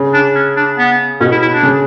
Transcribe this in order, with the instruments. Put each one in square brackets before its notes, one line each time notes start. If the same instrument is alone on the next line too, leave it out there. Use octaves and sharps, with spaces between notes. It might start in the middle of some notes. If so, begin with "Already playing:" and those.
Already playing: [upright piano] C#3
[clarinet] D4
C#4
D4
B3
[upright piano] B2 [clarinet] C#4
[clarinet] E4
E4
D4
[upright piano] C#3